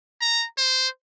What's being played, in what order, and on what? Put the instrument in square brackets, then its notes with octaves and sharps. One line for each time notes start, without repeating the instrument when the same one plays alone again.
[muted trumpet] A#5
C5